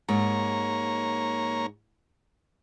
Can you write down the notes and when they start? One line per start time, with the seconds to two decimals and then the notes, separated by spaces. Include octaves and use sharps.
0.09 G#2 A#3 C#5 A#5